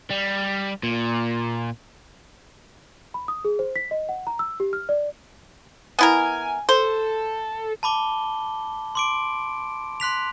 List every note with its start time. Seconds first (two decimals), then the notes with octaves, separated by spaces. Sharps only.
0.11 G3
0.83 A#2
3.14 B5
3.28 D#6
3.45 G#4
3.59 C5
3.76 B6
3.91 D#5
4.09 F#5
4.27 A#5
4.39 E6
4.60 G4
4.73 F6
4.89 D5
5.99 B3 E4 A#4 G#5
6.69 A4 C5
7.83 A5 B5 D6 G7
8.95 C6 D6 D7
10.00 C6 F#6 B6 F7